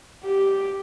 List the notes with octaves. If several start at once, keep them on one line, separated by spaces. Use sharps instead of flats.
G4